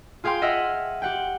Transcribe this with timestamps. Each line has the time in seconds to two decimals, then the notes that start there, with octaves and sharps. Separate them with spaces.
0.24 F4 G#4 F5 G5 C6
0.42 D#5 E5 F#5 F6
1.02 G4 F#5 G5